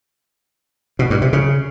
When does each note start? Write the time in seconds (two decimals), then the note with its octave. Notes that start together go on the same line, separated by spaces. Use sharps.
0.99 B2
1.10 G2
1.22 C3
1.33 C#3